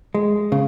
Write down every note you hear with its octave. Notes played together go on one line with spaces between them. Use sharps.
G#3
C#3